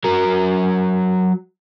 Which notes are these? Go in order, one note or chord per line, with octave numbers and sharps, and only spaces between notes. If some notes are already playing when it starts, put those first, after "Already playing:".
F#3 A#4